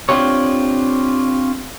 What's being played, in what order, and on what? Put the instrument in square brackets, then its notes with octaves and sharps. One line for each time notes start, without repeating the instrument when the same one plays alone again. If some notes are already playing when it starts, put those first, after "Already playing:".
[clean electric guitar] C4 D4 F4 G4 C#5